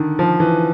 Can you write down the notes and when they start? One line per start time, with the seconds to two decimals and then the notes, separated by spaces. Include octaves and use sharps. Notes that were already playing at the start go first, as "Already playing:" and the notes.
Already playing: D3 D#3
0.19 F3
0.40 E3